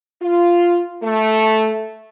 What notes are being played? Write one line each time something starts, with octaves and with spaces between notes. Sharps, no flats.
F4
A3